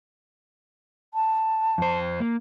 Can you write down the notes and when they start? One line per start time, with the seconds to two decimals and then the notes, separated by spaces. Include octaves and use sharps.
1.14 A5
1.78 F2 C5
2.20 A#3